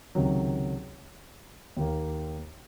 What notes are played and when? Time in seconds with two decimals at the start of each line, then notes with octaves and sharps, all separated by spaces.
0.15 C#2 C3 D#3 F#3
1.77 D#2 D#3 A#3